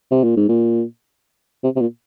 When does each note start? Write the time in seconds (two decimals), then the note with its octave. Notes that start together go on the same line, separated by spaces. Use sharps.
0.11 C3
0.24 A#2
0.36 G#2
0.49 A#2
1.64 C3
1.76 C3
1.81 A#2